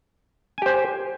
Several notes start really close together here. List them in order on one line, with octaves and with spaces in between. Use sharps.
G#5 G4 C5